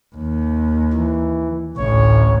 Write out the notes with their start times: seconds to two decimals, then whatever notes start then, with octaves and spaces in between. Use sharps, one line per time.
0.16 D#2
0.93 E3
1.77 A1 D2 C#5